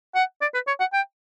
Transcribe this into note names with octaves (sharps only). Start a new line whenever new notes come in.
F#5
D5
B4
C#5
F#5
G5